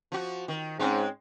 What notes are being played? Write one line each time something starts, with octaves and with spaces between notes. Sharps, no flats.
F3 F#4
D#3
G#2 G#3 C4 C#4